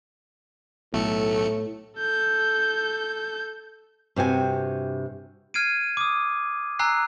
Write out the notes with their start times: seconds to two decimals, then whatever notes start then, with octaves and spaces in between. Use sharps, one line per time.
0.93 B1 A2 A3 C#7
1.97 A4 G6
4.16 G2 C3 F#4 G#5
5.54 F6 G#6 C7 D7 D#7
5.97 D6 D#6
6.79 G#5 A#5 E6 F#6 C7